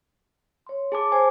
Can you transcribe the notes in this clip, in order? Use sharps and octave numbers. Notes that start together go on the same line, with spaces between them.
C#5 C6
G#4 C#5 A5 D6
C5 G#5